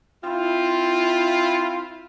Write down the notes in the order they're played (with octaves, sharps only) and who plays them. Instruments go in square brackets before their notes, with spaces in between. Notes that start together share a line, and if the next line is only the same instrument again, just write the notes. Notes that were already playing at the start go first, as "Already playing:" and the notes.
[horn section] C4 E4 F4